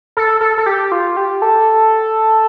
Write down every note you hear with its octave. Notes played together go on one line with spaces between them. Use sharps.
A4
A4
A4
G4
F4
G4
A4